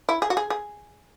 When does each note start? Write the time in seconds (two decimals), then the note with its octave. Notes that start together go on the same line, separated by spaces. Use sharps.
0.09 E4
0.22 G#4
0.30 F#4
0.37 G#4
0.50 G#4